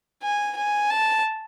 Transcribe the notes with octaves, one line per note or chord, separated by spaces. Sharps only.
G#5
G#5
A5